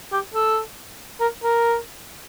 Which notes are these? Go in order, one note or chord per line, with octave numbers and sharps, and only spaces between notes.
G4
A4
A#4
A#4